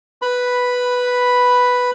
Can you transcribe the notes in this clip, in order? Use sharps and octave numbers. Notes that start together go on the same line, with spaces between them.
B4 B5